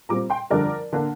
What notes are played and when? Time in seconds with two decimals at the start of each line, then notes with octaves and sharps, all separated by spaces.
0.09 A#2 G3 C4 A#5 D6
0.30 G5 C6
0.50 F2 D3 G3 D4 A#4 D5
0.93 D3 A#3 D4